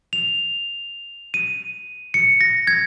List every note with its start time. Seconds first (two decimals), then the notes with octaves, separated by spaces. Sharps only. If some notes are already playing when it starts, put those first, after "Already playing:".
0.13 F7
1.34 D#7
2.14 C#7
2.41 A#6
2.67 G#6